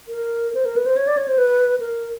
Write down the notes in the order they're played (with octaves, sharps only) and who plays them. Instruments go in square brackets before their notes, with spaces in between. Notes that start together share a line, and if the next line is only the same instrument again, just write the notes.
[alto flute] A#4
C5
A#4
B4
C5
C#5
D5
C#5
C5
B4
A#4